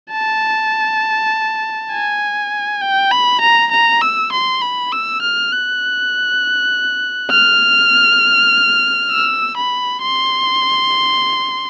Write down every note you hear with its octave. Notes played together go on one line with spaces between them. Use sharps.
A5
G#5
G5
B5
A#5
A#5
E6
C6
B5
E6
F6
F#6
F6
E6
B5
C6